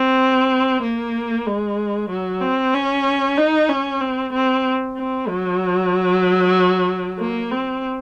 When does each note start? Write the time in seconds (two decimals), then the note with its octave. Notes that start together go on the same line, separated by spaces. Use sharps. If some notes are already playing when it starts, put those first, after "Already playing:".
Already playing: C4
0.82 A#3
1.46 G#3
2.10 F#3
2.41 C4
2.74 C#4
3.37 D#4
3.69 C#4
4.00 C4
4.33 C4
4.96 C4
5.29 F#3
7.20 A#3
7.51 C4